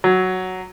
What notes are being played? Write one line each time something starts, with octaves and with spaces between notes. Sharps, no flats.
F#3